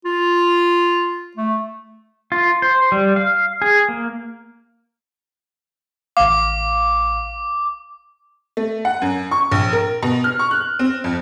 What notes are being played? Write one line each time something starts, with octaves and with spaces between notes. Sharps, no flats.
F4
A3
F4
C5
G3
F5
G#4
A#3
A1 F5 D6
A3
F#5
F#2
C#6
A#1
A#4
B2
F6
C#6
F#6
C4
F2